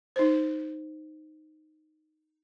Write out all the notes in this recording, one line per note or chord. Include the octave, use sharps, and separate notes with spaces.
D#4 C5